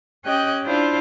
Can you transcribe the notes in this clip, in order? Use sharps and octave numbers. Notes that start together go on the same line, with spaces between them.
C#4 G4 D#5 G5 F#6
D4 E4 F4 C5